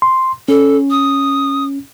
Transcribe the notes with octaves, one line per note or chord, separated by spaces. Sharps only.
C6
C#4 A4
D#6